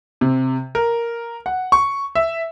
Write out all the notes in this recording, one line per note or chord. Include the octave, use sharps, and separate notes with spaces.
C3
A#4
F#5
C#6
E5